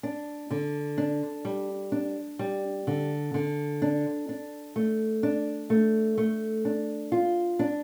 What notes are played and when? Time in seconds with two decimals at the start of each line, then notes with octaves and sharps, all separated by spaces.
0.03 D4
0.51 D3
0.98 D4
1.45 G3
1.92 D4
2.39 G3
2.87 D3
3.34 D3
3.82 D4
4.29 D4
4.76 A3
5.23 D4
5.70 A3
6.18 A3
6.65 D4
7.12 F4
7.59 D4